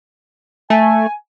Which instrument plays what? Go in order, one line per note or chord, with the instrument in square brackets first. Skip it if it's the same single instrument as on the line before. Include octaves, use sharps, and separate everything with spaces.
[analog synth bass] A3 [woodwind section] G#5